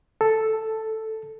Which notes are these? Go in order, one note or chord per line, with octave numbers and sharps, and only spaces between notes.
A4